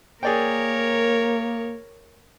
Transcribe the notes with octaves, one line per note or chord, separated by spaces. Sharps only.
A#3 G#4 A#4 C#5 D5 G5